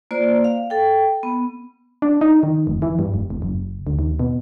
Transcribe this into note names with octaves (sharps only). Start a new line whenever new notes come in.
A#3 F4 C5 D5
F5
A4 G5
B3
D4
D#4
D#3
F1
E3
G2
F1
E1
F#1
D2
D#2
B2